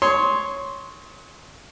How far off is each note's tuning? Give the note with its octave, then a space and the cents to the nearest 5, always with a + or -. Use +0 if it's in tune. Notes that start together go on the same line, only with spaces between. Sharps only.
C#5 +0 C6 +0 D#6 +40